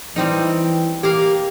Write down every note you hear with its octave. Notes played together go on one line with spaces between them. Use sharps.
E3 G3 C4 D#4
A#3 G4 A#4 F5